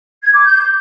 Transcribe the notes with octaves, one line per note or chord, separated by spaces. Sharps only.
G#6
D6
G6